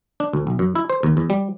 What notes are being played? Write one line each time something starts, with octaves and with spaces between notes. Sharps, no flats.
D4
D2
B1
F#2
E4
C5
D#2
E2
G3